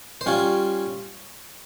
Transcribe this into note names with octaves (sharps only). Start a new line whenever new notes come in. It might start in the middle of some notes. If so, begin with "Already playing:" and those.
C5
G3 C#4 F4 C#5